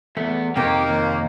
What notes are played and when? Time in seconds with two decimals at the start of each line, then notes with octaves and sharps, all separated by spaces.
0.17 E2 A3 B3
0.56 F2 C3 D#3 A#3 G4
0.89 D#2